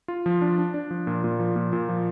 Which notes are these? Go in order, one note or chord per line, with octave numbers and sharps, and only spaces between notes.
F4
F3
D4
D4
D4
F3
A#2
A#2
F3
A#2
A#2
F3